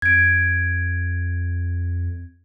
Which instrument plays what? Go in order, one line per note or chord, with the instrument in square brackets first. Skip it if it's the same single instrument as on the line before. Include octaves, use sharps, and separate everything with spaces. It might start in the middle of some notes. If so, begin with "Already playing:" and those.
[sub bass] F2 [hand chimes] G#6 D7